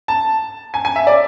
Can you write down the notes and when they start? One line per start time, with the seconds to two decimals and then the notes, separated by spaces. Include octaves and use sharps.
0.08 A5
0.74 G#5
0.85 G#5
0.96 E5
1.07 D5